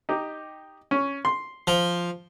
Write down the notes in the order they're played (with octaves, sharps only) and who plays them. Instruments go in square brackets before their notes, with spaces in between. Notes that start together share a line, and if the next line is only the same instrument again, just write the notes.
[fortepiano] D#4 G4
C#4
C6
[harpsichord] F3